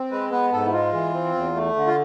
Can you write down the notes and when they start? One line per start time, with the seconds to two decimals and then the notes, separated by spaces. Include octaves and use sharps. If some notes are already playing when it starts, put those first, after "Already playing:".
Already playing: C4
0.11 G#3 B4
0.31 B3 B4
0.52 G#2 A4
0.66 E4
0.72 G#3 F4
0.93 E3
1.14 C4
1.35 E2
1.55 A3
1.76 D3
1.87 F4